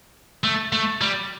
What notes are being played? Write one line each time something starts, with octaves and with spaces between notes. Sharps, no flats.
A3
A3
G3